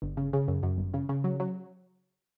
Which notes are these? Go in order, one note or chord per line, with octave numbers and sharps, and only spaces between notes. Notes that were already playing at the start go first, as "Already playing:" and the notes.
G1
C#3
C#3
F#2
F#2
G1
C#3
C#3
F#3
F#3